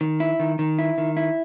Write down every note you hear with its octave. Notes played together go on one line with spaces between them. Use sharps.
D#3
E4
D#3
D#3
E4
D#3
E4